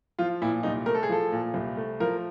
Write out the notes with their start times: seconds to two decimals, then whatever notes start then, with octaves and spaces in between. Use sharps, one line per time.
0.19 F3 F4
0.42 A#2 E4
0.63 C2 D#4
0.86 A3 A#4
0.95 A4
1.03 G#4
1.09 F3 A4
1.32 A#2
1.54 C2
1.77 A3
2.00 F3 A#4